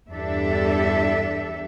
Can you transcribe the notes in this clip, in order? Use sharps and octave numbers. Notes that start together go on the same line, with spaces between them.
E2 G2 D4 G4 A4 E5